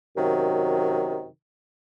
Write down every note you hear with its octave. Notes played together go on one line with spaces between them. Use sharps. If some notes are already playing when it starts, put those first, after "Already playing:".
F#2 C3 D#3 F#3